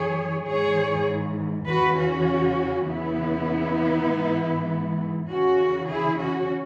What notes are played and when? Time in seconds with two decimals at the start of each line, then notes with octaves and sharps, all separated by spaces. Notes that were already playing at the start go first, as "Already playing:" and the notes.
Already playing: F#2 E3 G#4 C#5
0.46 G#2 E3 G#4 C#5
1.67 E2 C#3 E3 F#4 B4
1.97 C#4 F#4
2.87 E2 C#3 E3 B3 E4
4.08 G#2 E3
5.29 E2 C#3 E3 C#4 F#4
5.89 E4 G#4
6.19 C#4 F#4